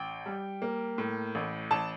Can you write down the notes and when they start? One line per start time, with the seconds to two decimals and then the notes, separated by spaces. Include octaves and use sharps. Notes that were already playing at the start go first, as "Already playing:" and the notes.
Already playing: A1 G5
0.26 G3
0.62 A#3
0.98 A2
1.35 A1
1.71 A1 A5